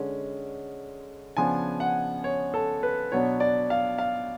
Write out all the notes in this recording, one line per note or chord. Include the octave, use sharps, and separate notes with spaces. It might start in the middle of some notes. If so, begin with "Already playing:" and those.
Already playing: D3 G#3 C#4
C#3 F3 B3 D4 G#5
F#5
C#5
A4
B4
B2 F#3 B3 D4 C#5
D5
F5
F5